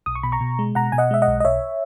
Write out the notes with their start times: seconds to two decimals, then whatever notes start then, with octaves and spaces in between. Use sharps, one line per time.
0.06 B1 D#6
0.15 C#6
0.23 B2 B5
0.32 A#5 C#6
0.41 B2
0.59 G#3
0.75 B2 F#5 A#5
0.92 B2 G#5
0.98 D#5 F#5
1.11 G#3 E5
1.22 D#5 F#5
1.28 B1
1.40 D#5
1.45 B1 C#5 E5